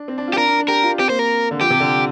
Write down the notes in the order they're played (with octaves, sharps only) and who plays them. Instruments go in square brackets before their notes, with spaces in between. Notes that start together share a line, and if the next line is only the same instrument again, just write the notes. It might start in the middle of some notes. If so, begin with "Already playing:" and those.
Already playing: [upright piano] D4
C4
D4
F4
[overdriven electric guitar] G4
[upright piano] D4 [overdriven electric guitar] A#4
[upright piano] D4
D4
[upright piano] G4 [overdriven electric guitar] A#4
[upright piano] F4
[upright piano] C4 [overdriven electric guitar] G4
[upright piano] A#3 [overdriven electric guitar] C5
[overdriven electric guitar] A#4
[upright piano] D3
[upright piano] F3 [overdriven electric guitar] G4
[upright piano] C3
D3